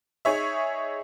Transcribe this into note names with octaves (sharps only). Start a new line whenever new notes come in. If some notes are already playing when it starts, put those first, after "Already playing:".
D#4 G#4 C#5 E5